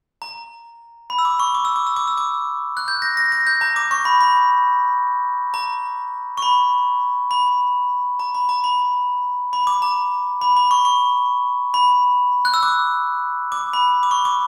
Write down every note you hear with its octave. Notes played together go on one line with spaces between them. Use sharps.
A#5
B5
E6
D6
C#6
D6
E6
D6
E6
D6
E6
D6
F#6
G6
A#6
A#6
A#6
G6
A#5
D6
C#6
B5
B5
A#5
C#6
B5
B5
A#5
B5
A#5
B5
B5
D6
A#5
B5
B5
C#6
C#6
B5
F#6
E6
D6
D6
B5
D6
C#6
D6